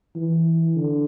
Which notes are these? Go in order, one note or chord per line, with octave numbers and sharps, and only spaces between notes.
E3
D3